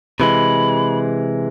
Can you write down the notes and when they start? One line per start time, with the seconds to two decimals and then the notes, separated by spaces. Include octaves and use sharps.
0.19 C3 E3 G#3 B5